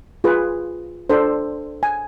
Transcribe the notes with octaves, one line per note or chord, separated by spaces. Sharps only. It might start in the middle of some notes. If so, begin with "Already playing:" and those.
F4 G#4 B4
D4 A4 C5
G#5